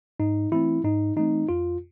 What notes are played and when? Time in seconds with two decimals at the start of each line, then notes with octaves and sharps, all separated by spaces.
0.20 G#2 D#4
0.52 E3 A3 C4 E4
0.84 G#2 D#4
1.16 E3 A3 C4 D#4
1.49 F2 F4